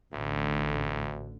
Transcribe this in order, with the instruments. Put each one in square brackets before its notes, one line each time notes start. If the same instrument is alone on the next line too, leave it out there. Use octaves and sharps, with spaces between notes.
[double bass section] A1 D3 [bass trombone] D2